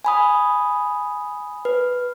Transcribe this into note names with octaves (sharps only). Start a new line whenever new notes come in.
G#5 B5 D#6
B4